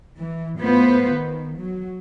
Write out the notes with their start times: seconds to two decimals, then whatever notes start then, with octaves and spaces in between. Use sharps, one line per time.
0.17 E3
0.59 A2 B3 F4 B4 C5
1.10 D#3
1.57 F#3